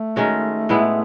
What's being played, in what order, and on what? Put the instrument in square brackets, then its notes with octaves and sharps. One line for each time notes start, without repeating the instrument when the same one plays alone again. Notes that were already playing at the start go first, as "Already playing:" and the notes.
Already playing: [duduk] A3
[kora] D#3 G#3 C#4 F#4
A2 G#3 B3 E4